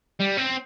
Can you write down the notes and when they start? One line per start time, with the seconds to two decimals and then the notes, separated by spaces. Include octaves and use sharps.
0.20 G3
0.38 C4